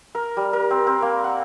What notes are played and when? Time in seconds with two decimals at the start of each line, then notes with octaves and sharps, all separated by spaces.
0.15 A#4
0.37 G3
0.53 A#4
0.71 C4
0.87 C4
1.02 A#3
1.24 F#5